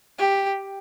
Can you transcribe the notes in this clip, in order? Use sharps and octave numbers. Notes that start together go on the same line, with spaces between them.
G4